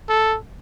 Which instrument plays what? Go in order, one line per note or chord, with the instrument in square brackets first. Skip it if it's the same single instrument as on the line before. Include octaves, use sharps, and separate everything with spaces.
[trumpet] A4